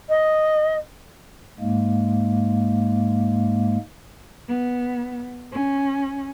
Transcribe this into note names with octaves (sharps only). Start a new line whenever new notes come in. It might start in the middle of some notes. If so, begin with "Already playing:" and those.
D#5
G#2 G#3 A#3
B3
C#4